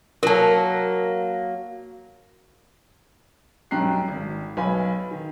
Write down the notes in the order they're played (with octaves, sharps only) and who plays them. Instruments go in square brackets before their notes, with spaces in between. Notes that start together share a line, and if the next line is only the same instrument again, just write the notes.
[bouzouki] F#3 A#3 [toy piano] A#4 A5
[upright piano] B1 G2 G5 A#5 F#6 C7
G#1
B1 B4 F5 G#5 B5
D#3